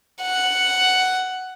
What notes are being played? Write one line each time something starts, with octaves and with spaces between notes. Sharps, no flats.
F#5